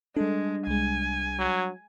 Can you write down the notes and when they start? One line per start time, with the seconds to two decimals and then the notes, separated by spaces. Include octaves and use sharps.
0.16 G3 G#3 D4 A4
0.67 C2 G#3 G#5
1.39 F#3